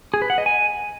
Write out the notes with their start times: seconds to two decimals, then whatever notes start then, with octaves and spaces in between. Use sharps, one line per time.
0.14 G#4
0.22 B4
0.30 F#5
0.38 D#5
0.46 G#5